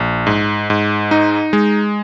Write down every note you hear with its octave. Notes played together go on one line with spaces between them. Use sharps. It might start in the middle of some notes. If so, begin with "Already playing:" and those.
Already playing: A#1
G#2
G#2
D#4
G#3